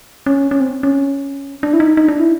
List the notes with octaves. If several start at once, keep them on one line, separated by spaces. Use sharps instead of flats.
C#4
C#4
C4
C#4
D4
E4
D#4
D#4
D4
E4